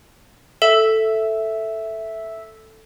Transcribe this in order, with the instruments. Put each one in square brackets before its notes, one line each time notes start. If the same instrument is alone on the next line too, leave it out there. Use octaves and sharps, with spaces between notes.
[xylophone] A4 [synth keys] E5